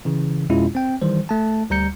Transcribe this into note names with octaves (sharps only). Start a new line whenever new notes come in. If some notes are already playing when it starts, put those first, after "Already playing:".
C#3 E3
F2 B2 G#3 C#4 E4 F4
C4 G5
D#3 E3 G3 C5
A3 A5
D2 G3 A#5 G6 C#7